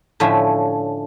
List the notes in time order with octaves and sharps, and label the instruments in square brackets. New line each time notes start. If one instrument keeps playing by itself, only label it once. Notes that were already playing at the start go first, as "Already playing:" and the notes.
[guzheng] A2 D3 F3 C#4 E5 G#5